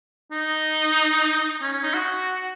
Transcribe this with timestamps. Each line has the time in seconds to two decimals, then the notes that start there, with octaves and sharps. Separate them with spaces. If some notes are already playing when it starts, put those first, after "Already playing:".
0.32 D#4
1.62 C#4
1.73 C#4
1.83 D#4
1.94 F#4